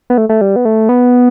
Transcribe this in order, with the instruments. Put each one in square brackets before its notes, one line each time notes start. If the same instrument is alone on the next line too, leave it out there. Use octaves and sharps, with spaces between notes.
[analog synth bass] B3
A3
A3
G3
B3
A3
B3